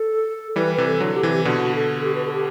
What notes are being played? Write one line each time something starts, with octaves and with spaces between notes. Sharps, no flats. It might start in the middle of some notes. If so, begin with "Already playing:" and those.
Already playing: A4
E3 G3 B4
C3 E3 B4
A4
D3 F#3
G4
C3 E3
B2 D3 F#4
A4
G4
B4
A4
G4